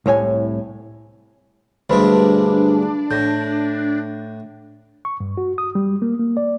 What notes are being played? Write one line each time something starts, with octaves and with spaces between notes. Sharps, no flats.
C2 A2 C#5 G#5
D2 G2 G#3 D4 B4 C5 B5
A2 G6 A#6
C#6
G2
F#4
D#6
G3
A#3
A#3
D5